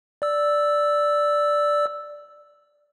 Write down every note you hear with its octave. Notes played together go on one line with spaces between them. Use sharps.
D5 E6